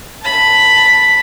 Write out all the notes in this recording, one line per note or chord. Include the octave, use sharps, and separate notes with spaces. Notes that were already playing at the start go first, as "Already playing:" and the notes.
A5 B5